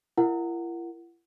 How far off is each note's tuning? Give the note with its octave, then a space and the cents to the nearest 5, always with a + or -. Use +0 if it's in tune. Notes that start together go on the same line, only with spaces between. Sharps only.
E4 +45 A#4 +0 F#5 +0